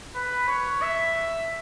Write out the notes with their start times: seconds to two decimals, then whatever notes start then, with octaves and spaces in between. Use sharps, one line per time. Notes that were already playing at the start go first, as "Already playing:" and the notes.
0.15 B4
0.48 C#5
0.82 E5